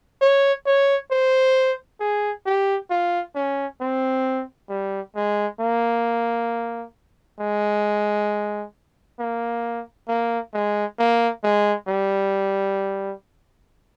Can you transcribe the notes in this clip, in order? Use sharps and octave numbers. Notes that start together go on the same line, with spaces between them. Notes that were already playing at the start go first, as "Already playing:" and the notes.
C#5
C#5
C5
G#4
G4
F4
C#4
C4
G3
G#3
A#3
G#3
A#3
A#3
G#3
A#3
G#3
G3